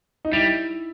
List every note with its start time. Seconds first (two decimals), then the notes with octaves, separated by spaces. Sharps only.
0.25 D#4
0.32 G3 E4